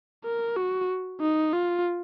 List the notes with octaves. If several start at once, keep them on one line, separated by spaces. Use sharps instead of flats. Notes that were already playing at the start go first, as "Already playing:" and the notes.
A#4
F#4
D#4
F4